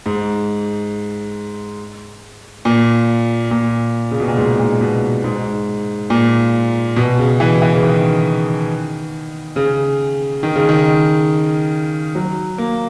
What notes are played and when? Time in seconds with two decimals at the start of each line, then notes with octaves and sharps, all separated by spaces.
0.06 G#2
2.65 A#2
3.51 A#2
4.11 C#3
4.20 B2
4.28 A#2
4.37 G#2
4.59 A#2
4.81 B2
5.24 G#2
6.10 A#2
6.96 B2
7.18 C#3
7.40 E3
7.62 E3
7.74 C#3
7.83 D#3
9.56 C#3
10.43 D#3
10.55 C#3
10.69 D#3
12.15 F#3
12.58 A#3